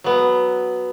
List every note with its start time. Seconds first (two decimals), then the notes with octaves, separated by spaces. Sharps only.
0.04 F#3 B3